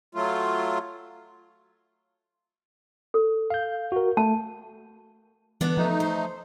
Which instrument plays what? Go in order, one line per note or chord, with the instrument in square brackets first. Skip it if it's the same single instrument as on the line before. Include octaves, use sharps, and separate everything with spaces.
[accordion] F#3 A3 F4
[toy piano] A4
[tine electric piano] F5 G6
F#4 A#4
[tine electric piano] A3 [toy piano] A5
[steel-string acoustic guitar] D3 B3 D4 [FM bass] E3
[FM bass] F3 [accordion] A3 D#4
[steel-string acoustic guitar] C5